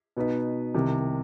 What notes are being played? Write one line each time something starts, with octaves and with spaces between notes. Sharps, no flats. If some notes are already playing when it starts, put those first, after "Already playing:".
B2 B3 D#4 B4
C2 C3 D#3